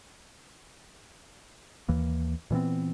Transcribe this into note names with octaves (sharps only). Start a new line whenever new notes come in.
D#2 E3 A#3
A#2 E3 B3 C4